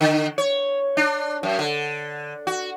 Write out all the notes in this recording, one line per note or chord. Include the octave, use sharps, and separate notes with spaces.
D3
C#5
D4
F#2
D3
F#4